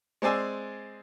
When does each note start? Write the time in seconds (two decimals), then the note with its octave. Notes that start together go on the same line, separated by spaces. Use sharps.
0.22 G#3 C4 D5 G#5 E6